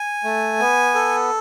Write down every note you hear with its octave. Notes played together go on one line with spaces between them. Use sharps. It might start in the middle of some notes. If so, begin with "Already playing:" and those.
Already playing: G#5
A3
B3
A4